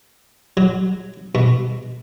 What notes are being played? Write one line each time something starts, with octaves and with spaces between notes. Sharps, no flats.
F#3
B2